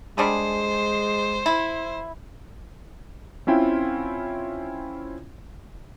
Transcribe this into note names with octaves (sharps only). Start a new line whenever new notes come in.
G3 G#3 D4 G#4 C5
E4
C4 C#4 E4 F4 G5